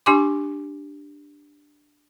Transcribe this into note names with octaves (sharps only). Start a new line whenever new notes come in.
D4 G4 G#5 C6 D6